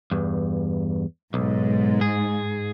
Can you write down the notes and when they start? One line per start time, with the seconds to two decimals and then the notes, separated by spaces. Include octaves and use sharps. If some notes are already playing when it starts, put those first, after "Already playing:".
0.11 E2 G2
1.34 B1 G#2
2.01 G#4